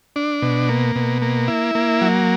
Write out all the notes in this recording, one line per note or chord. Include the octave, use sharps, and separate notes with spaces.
D4
B2
A#3
B2
A#3
E4
A#3
F#3